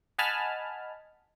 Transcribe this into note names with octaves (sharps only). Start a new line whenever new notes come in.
D#5 F#5 G#5 A5 B5 F6